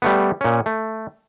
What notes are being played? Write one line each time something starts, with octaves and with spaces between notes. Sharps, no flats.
G3 A3 B3
A#2 C#4
A3